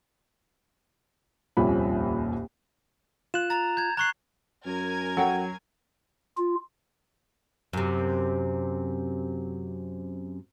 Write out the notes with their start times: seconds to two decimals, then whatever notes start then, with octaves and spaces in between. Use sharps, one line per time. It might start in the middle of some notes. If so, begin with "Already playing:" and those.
1.57 D#1 C2 F2 A#2 C#4 B5
3.34 F4 F#6 E7
3.50 A#5 A6
3.77 G6 G#6
3.97 A#5 C#6 F#6 C7
4.66 F#2 A#4 G#5 G#6
5.17 F#3 A4 F#5 G5
6.38 F4
7.73 F#2 C3